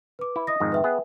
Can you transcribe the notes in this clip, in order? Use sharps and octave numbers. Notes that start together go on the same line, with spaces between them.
B4 D6
E4
D#5 D#6 A#6
F2 G#2 D#3
B4 E5 G5
B3 G#4